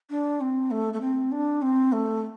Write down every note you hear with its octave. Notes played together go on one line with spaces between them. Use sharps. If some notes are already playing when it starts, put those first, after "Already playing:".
D4
C4
A3
A3
C4
D4
C4
A3